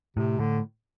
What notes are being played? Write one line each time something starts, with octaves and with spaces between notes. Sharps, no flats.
A2 C3
A2 D3